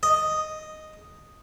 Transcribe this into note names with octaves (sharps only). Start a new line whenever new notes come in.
D#5